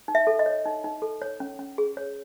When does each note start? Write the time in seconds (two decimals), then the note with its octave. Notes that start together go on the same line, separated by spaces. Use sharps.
0.08 D#4
0.15 E5
0.27 A4
0.39 D#5
0.46 C#5
0.65 D#4
0.84 D#4
1.02 A4
1.22 C#5
1.40 C#4
1.59 C#4
1.78 G#4
1.97 C#5